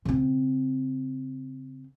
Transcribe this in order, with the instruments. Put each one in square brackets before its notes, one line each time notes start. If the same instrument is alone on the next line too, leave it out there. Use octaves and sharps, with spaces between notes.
[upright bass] C#3 C4